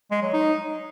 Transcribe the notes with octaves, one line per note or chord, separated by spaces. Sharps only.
G#3
F#3
D#4